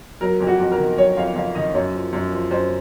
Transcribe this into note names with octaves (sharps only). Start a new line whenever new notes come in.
F#3 A#4
F2
F#4
F2
A#4
D#3
F#3 C#5
F2 F5
F2 F5
D#3 D#5
F#2 C#5
F3
F#2
F3
F#2 C5